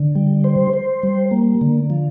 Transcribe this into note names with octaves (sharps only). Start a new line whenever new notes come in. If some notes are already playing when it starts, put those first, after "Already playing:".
Already playing: D3
G3
C5
C5
G3
A#3
D3
F3